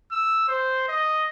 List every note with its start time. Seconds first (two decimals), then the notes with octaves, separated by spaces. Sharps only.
0.12 E6
0.48 C5
0.88 D#5